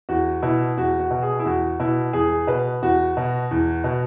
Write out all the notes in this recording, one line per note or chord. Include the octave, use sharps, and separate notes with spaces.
E2 F#4
B2 E4
E2 F#4
F#4
B2
G#4
E4
E2 F#4
B2 E4
E2 G#4
B2 B4
E2 F#4
B2
E2
B2